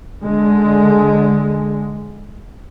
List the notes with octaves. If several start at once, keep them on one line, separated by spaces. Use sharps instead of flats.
D3 G#3